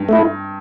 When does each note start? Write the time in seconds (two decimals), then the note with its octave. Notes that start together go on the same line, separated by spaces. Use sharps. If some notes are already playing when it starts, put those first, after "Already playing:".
Already playing: G2
0.09 A3 E4